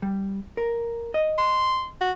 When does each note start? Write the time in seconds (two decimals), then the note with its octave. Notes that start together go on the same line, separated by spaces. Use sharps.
0.02 G3
0.57 A#4
1.14 D#5
1.38 C6
2.01 F#4